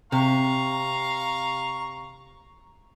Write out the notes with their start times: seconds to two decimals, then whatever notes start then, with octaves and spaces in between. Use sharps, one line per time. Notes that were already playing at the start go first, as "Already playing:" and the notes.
0.12 C3 F5 A#5 C#6